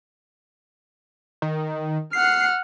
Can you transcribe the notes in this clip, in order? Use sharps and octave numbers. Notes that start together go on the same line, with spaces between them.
D#3
F#5 F6 C7